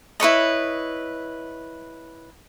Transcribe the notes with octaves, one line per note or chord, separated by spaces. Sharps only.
E4 B4 C#5 D#5